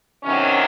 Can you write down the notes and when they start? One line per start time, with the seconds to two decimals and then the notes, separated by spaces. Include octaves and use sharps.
0.23 E2 C3 D#3 F#3 C#4